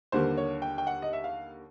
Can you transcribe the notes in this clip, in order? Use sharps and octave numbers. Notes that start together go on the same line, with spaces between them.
D#2 D3 G3 A#3 C5
C#5
G5
G5
F#5
D#5
E5
F5